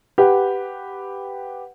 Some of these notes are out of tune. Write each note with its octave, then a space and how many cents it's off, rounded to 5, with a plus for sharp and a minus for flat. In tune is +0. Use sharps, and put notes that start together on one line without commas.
G4 +0 B4 +5 F#5 +0